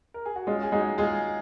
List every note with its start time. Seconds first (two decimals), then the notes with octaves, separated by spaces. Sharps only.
0.14 A#4
0.26 G#4
0.36 F#4
0.47 G#3 C#4 F4
0.63 G#4
0.72 G#3 D#4 F#4
0.98 G#3 F4 G#4